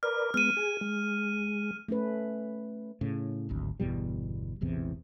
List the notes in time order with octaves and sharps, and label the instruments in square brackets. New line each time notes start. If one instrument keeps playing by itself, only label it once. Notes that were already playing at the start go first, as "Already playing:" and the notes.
[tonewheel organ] A#4 B4 D5 [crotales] F6
[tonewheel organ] G#3 B3 [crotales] F6 D#7
[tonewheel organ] G#4
G#3
[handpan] A3 C#4 B4
[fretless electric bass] A2 C#3
D1 G#1 D2
G1 E2 B2 G3
E1 A1 E2 C3